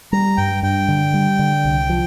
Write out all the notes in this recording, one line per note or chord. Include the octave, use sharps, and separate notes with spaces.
G3 A#5
G2 G5
G2 G5
D3
G3
D3
C2
F3